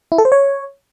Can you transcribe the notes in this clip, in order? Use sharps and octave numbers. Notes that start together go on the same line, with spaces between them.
E4
A4
C5
C#5